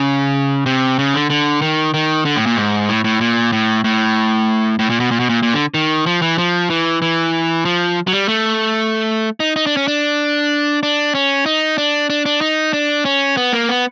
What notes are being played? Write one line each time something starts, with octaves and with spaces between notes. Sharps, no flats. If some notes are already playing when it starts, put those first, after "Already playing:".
Already playing: C#3
C3
C#3
D3
D3
D#3
D#3
D3
A2
A#2
G#2
A2
A2
A#2
A2
A2
A2
A#2
B2
A#2
B2
A#2
A#2
D3
D#3
F3
E3
F3
E3
E3
F3
F#3
G3
A3
D#4
D#4
D4
C#4
D4
D4
C#4
D#4
D4
D4
D4
D#4
D4
C#4
B3
A#3
B3